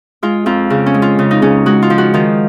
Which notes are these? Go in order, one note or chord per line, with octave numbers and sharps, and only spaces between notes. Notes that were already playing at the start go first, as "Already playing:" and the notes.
G#3 F4
F2 F4
C#3
C#4
G#3
F4
C#3
D#4
C#3 C#4
G#3 F#4
F4
F3
F#4
D#3 F4